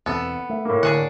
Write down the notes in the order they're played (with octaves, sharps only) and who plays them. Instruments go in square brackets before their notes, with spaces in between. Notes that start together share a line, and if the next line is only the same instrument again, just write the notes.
[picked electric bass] E1 E2 C4 [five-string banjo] B3 A4
[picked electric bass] A3
[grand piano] A2 A#3
[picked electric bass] D3 [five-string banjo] D4 G#4 F#5